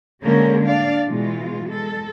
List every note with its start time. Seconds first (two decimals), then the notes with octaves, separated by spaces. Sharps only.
0.22 D3 G3 G#3 A#3 C#4 A#4
0.65 D4 D5 F5
1.06 B2 E3 G#3 F4
1.66 G#3 A4